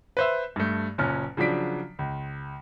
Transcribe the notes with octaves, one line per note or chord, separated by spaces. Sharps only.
B4 C5 E5
G2 A3
F#1 A#2 C#4 F6
C#3 F3 F#3 D4 B6 D7
C#2